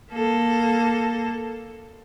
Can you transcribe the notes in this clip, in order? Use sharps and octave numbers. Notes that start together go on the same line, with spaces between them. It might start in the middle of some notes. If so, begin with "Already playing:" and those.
A#3 A4